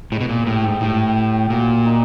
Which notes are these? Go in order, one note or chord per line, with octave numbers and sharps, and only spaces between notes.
A2 G#3
B2
A#2
A2 G4
G#2
A2 G4
G4
A#2 F#4
D#4